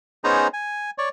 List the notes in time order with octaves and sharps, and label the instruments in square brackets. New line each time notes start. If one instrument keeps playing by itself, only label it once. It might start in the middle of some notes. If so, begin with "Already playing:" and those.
[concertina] B3 C#4 D#4 G#4 C5 A#5
G#5
C#5 D5